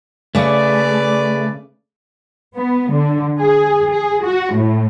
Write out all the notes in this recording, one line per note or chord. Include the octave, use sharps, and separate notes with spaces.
C#3 A3 C#4 G#4 B4 D5
B3
D3
G#4
G#4
F#4
A2